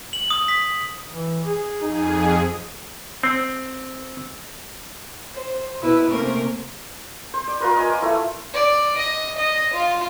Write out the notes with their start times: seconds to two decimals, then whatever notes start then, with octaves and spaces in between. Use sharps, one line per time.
0.13 F#7
0.30 D#6
0.48 B6
1.11 E3
1.44 G#4
1.82 F2 D#4 G#4
3.23 C4
5.34 C5
5.82 B2 E4 B4
6.11 C3 A3 A#3 C#4 A#4 C5
7.34 C5
7.47 D5
7.60 F4 A#4 B4
7.76 D#5 G#5
7.90 D6
8.02 A3 E4
8.54 D5
8.97 D#5
9.37 D#5
9.73 F4